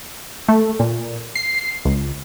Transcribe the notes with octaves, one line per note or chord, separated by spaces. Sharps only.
A3
A#2
C7
C#2